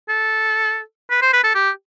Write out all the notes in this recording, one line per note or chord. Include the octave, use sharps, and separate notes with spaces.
A4
B4
C5
B4
A4
G4